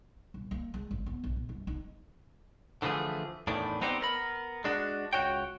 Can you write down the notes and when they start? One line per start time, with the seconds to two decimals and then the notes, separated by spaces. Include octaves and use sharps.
0.34 D#1
0.51 A#3
0.74 G#3
0.91 G#1
1.06 B3
1.24 A#1
1.36 A#2
1.49 G2
1.67 D#4
2.82 D3 E3 F3 A3 G#4
3.47 E2 A2 D#3 E3 D4
3.81 B3 C4 D#4 G4 C5 D5
4.01 B3 A#4 B5
4.64 G#3 D4 F#4
5.13 C#2 G2 F#4 C#5 G5